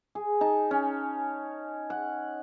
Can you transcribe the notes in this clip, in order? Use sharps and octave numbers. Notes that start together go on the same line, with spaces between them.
G#4
D#4 A5
C#4
F#5